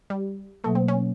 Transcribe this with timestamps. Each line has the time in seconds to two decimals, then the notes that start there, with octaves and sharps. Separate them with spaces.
0.10 G3
0.64 B2 F#3 A3 A#3
0.75 C4
0.88 C#4